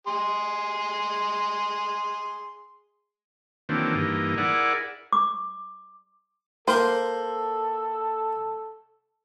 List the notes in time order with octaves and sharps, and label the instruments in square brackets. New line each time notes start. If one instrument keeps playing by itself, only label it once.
[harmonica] G#4 C6
[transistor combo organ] D#3 E3 F#3 A#3 C4 D4
G2 E3 A#3 D#4
E4 G#4 A#4 D5 F#5
[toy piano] D6
[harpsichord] A#3 A#4 C6 [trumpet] A4 [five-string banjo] C5